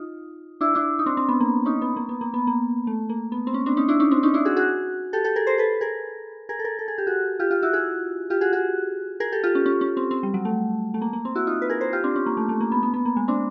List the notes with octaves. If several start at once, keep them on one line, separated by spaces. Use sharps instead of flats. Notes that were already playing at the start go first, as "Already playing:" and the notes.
Already playing: D#4 F4
D4 E4
D4 E4
D#4
C4 D4
C4
B3
A#3
C#4 D#4
B3
A#3
B3
A#3
B3
A#3
A3
A#3
B3
C4
C#4
C4 D4
C#4 D#4
D4 E4
C#4 D#4
C4 D4
C#4 D#4
D4 E4
F#4 G#4
F#4 G#4
G4 A4
G4 A4
G#4 A#4
A#4 C5
A4 B4
G#4 A#4
G#4 A#4
A4
G#4 A#4
A4
G#4
G4
F#4 G#4
F4 G4
F4 G4
E4 F#4
F#4 G#4
F4 G4
F#4 G#4
F#4 G#4
G#4 A#4
G4 A4
F4 G4
C#4
C#4
C#4
C4
C4
G3
F#3
A3
A3
A#3
A#3
C4
E4 F#4
D#4 F4
B4
G#4 A#4
A#4 C5
F4 G4
C4 D4
C#4
A#3
A3
A3
A#3
B3
B3
B3
A#3
G#3
C4 D4